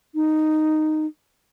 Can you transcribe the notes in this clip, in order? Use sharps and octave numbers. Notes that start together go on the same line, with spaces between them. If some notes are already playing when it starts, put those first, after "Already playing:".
D#4